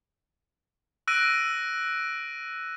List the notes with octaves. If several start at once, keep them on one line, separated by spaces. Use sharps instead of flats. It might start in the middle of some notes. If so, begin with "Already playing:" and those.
E6 F#6 A#6 D7 D#7